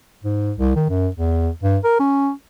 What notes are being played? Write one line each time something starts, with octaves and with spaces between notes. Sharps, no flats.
G#2
C2
D#3
F#2
E2
G2
A#4
C#4